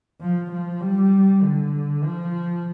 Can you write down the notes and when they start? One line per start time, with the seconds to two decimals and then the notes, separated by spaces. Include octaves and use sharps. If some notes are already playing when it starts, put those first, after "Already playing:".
0.21 F3
0.51 F3
0.81 G3
1.43 D3
2.04 F3